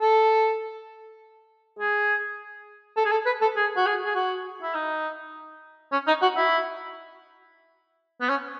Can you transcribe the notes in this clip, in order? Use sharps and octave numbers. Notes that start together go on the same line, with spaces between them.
A4
G#4
A4
G#4
A4
B4
A4
G#4
F#4
G#4
G#4
F#4
E4
D#4
C#4
D#4
F#4
E4
B3
C#4